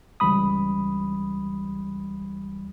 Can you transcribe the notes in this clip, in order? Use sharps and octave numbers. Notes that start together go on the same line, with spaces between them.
G1 C#2 E3 G3 B5 D#6